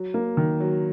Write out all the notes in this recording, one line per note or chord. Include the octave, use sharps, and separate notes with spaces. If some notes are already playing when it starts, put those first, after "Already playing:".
Already playing: F#3
A#3
D#3
F#3